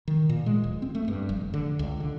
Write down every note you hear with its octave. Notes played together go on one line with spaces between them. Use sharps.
D#3
A#2
G#3
D1
C4
A3
G2
F1
D3
C#2
D3